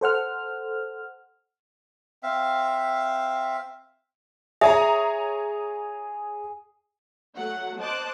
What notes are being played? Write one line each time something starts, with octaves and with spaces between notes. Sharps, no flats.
A4 C5 F#5 F6
C4 E5 F5
G#4 C#5 E5 G#5 A#5
F#3 A3 F#5
C5 D#5 A5 D6 F#6